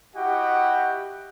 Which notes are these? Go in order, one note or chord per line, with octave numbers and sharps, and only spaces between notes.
E4 F#4 G4 D#5 F#5 G5